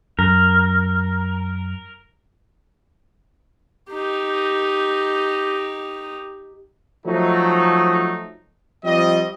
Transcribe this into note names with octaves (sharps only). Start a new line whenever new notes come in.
F#2 A#4
D#4 G4
F3 F#3 A3 D#4
F3 G3 C4 D#5